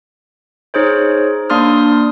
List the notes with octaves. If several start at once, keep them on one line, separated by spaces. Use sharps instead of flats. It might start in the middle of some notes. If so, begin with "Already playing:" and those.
D#4 G#4 C5 C#5
A#3 D4 D5 C6 D#6 F6